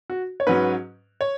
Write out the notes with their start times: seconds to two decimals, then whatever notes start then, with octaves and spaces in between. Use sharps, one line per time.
0.10 F#4
0.40 C#5
0.47 G#2 F#3 C#4 B4
1.21 C#5